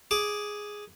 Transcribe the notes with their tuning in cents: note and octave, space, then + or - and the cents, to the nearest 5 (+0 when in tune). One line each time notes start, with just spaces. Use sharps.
G#4 +0 D6 +0